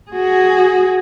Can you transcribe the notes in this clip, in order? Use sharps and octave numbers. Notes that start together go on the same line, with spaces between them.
F#4 G#4